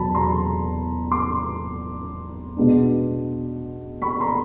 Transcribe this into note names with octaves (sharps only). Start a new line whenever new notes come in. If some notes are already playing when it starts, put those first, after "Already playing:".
Already playing: E2 B2 F#3 A5 B5
A#5 C6
C6 D6
B2 G#3 B3 D4
B5 C#6
A#5 C6